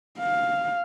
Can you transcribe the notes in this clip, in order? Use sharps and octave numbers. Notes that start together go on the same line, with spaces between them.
F5